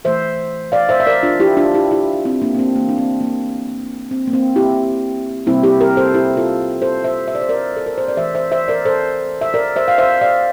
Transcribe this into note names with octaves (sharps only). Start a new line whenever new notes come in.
E3 A3 C5 E5
D5 F5
C5 E5
E5
A#4 D5
D4 F4
E4 G4
D4 F4
E4 G4
E4 G4
C4 E4
A#3 D4
A#3
C4
E3 A3 A#3
D4
C4
A#3
C4
A#3
C4
E4 G4
C3 G3 A#3 C4 E4
E4 G4
G4 A#4
A4 C5
E4 G4
F4 A4
A4 C5
C5 E5
E5
D5
C5
A#4 D5
A4
A#4
C5
D5
E3 A3 C5 E5
C5 E5
C5 E5
A#4 D5
A4 C5
E5
A#4 D5
C5 E5
F5
C5 E5
D5 F5